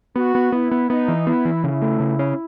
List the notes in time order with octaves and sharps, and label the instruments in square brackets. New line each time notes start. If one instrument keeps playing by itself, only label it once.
[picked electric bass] B3 [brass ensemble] F#4
[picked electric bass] B3
[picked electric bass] B3 [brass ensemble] E4
[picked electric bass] B3
[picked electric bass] B3 [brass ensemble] D#4
[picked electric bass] E3
[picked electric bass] B3 [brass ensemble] E4
[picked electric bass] E3
[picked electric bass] C#3 [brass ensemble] E4
[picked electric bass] A3
C#3
C#4